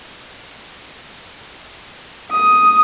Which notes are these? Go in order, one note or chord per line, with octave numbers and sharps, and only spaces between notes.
D#6